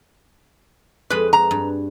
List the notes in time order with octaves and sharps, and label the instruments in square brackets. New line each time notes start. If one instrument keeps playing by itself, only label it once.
[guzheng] F2 G#3 [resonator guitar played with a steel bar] B4
[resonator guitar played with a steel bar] A#5
[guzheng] G2